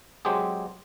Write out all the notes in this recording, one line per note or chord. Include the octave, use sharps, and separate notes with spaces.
F#3 G#3 C4 G4 G#4